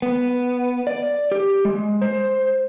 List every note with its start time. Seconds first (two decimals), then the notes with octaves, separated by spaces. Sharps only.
0.02 B3
0.87 D5
1.32 G4
1.65 G#3
2.02 C5